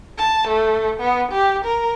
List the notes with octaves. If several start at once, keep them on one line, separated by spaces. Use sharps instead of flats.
A5
A3
B3
G4
A#4